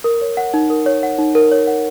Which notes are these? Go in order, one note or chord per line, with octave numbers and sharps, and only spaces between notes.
A#4
C#5
F#5
D#4
A#4
C#5
F#5
D#4
A#4
C#5
F#5